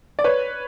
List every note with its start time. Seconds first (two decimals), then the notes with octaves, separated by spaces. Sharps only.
0.19 D5
0.24 B4 C#5